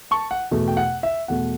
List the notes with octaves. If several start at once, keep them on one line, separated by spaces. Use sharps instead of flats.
A5 C#6
F#5
E2 B2 A3
G5
F#5
E5
E2 B2 A3 F#5